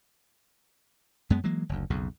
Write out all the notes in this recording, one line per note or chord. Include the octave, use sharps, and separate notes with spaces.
F#2 G#3 B3
E3 F#3 G#3 A#3
F#1 D2
B1 F2 C#3